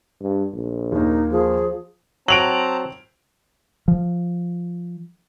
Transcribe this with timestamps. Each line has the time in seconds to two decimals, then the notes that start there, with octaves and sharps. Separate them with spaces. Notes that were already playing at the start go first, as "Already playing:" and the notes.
0.21 G2
0.53 A#1
0.92 D#2 A#3 D#4
1.32 F3 G#4
2.28 F#3 C4 A5 A#5 D7 F7 F#7
3.88 F3